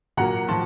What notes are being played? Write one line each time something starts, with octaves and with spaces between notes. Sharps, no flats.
A#2 F#3 A#3 F#5 A#5
A2 F3 A5 C6